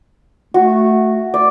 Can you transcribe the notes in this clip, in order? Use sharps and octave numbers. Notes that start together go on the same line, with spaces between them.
A3 F#4
D5